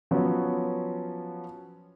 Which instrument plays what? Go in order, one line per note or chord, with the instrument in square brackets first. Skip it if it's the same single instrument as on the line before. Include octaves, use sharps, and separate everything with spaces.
[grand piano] F3 F#3 B3 C#4 F#4